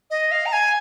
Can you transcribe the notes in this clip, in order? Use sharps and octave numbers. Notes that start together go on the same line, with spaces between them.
D#5
F5
A#5
G#5